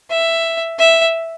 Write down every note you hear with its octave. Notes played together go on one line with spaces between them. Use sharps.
E5
E5